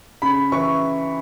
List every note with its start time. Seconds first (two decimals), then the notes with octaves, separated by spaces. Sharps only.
0.22 C#3 B5
0.52 E3 C#6